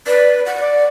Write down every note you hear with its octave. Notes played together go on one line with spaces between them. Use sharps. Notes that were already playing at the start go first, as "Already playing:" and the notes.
B4 D5
F#5
D5